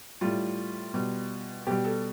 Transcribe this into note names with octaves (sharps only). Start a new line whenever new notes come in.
A2 G3 F4
B2 G3
B2 G3 G4
A4